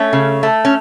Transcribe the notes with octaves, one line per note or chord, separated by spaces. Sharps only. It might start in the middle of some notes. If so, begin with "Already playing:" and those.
Already playing: A3 C#4
C#3
A3
C#4